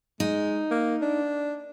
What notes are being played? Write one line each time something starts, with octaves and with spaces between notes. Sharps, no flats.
G#3 D#4
A#3
D4